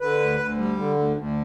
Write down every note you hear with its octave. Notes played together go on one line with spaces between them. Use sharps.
D3 B4
D2
D2
G3
D3
D2
D2